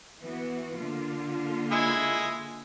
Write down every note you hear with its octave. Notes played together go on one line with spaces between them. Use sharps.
E3 B3 F#4
D3 A#3 F4
G#3 E4 G#5